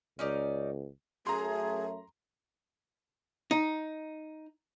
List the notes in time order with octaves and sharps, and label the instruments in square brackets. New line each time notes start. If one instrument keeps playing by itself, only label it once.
[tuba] C#2 [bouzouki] C#4 D#4 D5
[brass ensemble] F#2 A3 [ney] G#4 [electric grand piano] A#5 C6
[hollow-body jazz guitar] D#4